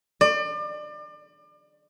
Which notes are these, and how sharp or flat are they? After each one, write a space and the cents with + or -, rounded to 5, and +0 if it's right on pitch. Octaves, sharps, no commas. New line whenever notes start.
D5 +35